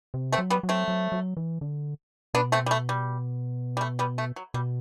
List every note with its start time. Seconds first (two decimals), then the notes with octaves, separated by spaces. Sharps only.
0.14 C3
0.32 A3 C4
0.38 F#3
0.50 G3 B3
0.63 F#3
0.69 A3 C4
0.88 F#3
1.12 F#3
1.37 E3
1.61 D3
2.34 B2 B3 D4
2.52 A3 C4
2.66 G3
2.71 A3
2.89 G3
3.77 G3
3.81 A3
3.99 G3 B3
4.18 A3
4.36 F#3
4.54 B2 G3